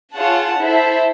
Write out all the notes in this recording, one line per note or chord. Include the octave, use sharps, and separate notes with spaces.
F4 G#4 C#5 F#5 A5
E4 A4 C5 E5